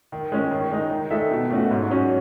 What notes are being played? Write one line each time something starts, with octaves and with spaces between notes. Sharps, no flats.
D#3
G#3 C#4
D#3
G#3 D#4
D#3
G#3 D#4 A4 E5
B2
A3 C#4 F#4
G#2
F#3 C#4 F#4